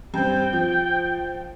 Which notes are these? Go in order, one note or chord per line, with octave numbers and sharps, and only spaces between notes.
G2 C4 G5
F3